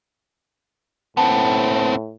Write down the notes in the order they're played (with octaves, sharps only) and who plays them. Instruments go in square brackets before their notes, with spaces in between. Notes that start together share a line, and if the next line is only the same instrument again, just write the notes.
[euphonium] A2 [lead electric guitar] B3 C4 [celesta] A5